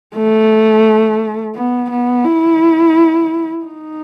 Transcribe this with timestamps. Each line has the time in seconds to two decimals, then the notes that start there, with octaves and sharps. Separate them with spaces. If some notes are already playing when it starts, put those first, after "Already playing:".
0.16 A3
1.55 B3
1.90 B3
2.25 E4
3.65 D#4